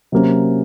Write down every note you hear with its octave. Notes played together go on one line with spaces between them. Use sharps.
C3 F#3 A#3 C#4